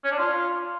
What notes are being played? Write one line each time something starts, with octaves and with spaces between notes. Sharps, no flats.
C#4
D4
F4